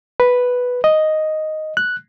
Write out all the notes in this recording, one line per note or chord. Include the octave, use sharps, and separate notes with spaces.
B4
D#5
F#6